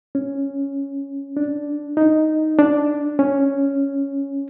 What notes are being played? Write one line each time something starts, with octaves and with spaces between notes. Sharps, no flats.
C#4
D4
D#4
D4
C#4